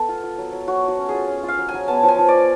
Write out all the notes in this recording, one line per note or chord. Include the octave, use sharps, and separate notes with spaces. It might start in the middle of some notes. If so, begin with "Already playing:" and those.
Already playing: B3 A4
F4
F4
F#3
F#3
F#3 F#4
F#3 F#4
C#4
G#4
F4
C#4
F4
F5
F#3
G#5
F#3
B3 A5
F3
G#5
F3
D5
F3